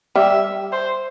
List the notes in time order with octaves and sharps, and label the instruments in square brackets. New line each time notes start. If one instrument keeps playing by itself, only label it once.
[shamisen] G3 G4 [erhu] E5
[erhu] C5